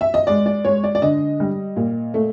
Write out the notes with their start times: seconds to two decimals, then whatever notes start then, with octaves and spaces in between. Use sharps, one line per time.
0.01 E5
0.14 D#5
0.27 G#3 D5
0.46 D5
0.65 G#3 C#5
0.84 D5
0.95 D5
1.02 D3 D#5
1.40 G3
1.76 A#2
2.14 A3